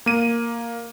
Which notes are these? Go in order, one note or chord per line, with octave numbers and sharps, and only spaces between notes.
A#3 D#7